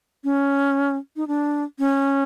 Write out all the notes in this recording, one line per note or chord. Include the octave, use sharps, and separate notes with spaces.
C#4
D#4
D4
C#4